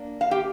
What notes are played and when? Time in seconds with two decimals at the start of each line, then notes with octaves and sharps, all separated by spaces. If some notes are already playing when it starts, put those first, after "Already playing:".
Already playing: A#3 D4
0.21 F5
0.31 G4 G5